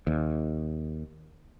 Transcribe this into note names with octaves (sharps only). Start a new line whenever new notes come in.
D#2